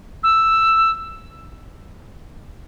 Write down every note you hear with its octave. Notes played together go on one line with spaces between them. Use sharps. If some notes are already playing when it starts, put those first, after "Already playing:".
E6